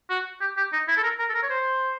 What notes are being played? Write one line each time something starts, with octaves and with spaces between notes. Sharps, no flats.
F#4
G4
G4
D#4
E4
A4
A#4
A#4
A4
A#4
C#5
C5